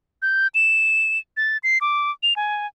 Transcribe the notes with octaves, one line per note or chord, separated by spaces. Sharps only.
G6
E7
A6
C7
D6
F7
G#5